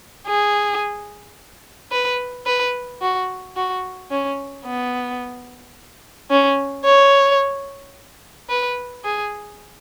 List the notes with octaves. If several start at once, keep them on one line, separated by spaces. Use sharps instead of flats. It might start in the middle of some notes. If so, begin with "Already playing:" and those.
G#4
B4
B4
F#4
F#4
C#4
B3
C#4
C#5
B4
G#4